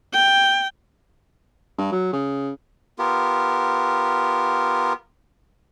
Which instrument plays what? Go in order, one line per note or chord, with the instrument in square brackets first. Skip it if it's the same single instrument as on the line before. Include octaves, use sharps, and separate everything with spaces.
[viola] G5
[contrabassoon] G2
F#3
C#3
[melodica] B3 F4 G4 A#4